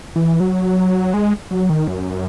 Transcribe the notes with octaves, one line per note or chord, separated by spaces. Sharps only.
E3
F#3
G#3
F#3
D#3
F#2